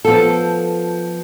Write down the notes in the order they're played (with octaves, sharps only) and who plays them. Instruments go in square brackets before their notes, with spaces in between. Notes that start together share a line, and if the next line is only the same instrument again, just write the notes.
[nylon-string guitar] F3 B3 F4 A4